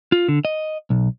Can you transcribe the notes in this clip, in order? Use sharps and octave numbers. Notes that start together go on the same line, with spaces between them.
F4
D3
D#5
B1